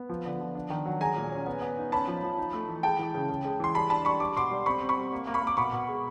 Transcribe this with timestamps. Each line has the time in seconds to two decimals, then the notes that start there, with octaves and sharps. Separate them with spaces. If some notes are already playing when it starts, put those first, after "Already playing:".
Already playing: B3
0.09 F3
0.25 D3
0.41 F3
0.55 D4
0.70 D#3
0.86 F#3
1.00 G#3 G#5 A#5
1.16 A#2
1.32 C#4
1.46 B3
1.62 B3
1.78 D#4
1.92 C#4 A5 B5
2.07 F3
2.23 F3
2.38 D#4
2.53 A3
2.68 E3
2.83 G#3 G5 A5
2.99 E3
3.14 C#3
3.29 C#3
3.45 G#3
3.60 E3 C6
3.75 G3 A5 B5
3.90 D4 A5 B5
4.05 G3 B5 C#6
4.20 G3 D6
4.36 B2 C6 D6
4.51 G3
4.66 C4 B5 C#6
4.81 C4
4.89 B5 C#6
4.97 G3
5.12 A#3
5.27 A#3
5.34 B5 C#6
5.42 A#3
5.47 D6
5.57 B2 B5 C#6
5.73 B2
5.88 G#3